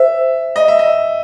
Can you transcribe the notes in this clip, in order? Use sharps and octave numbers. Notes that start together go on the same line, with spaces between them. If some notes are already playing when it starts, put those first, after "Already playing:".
Already playing: C5 E5
D#5
E5
D#5